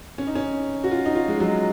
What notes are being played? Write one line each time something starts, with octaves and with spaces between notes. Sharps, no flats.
C#4
D#4
C#4
F#4
F4
D#4
F4
G#3
F#3